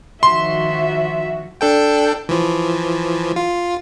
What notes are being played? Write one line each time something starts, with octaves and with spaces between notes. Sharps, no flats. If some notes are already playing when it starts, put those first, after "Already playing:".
D#3 F3 F#4 E5 C6
D4 A4 G5
E3 F3
F4